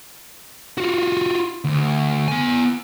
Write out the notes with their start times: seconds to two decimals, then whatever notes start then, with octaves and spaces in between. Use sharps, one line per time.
0.78 F4 F#4
1.64 D2
2.28 B3 G#5